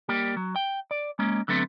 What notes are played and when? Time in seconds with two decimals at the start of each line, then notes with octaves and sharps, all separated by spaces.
0.09 G3 A#3 G4
0.37 F#3
0.56 G5
0.91 D5
1.19 G#3 A#3 C#4
1.48 D3 F#3 A3 B3 C4